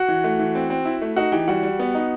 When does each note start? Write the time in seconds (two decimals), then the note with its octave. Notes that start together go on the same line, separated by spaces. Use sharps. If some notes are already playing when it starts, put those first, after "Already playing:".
Already playing: F#4 F#5
0.08 E3
0.24 A3
0.39 E3
0.55 C4
0.70 C4
0.85 E4
1.02 A3
1.16 D#4 F#4 F#5
1.32 E3 G4 G5
1.48 G3 F#4 F#5
1.63 G3
1.79 B3
1.95 D#4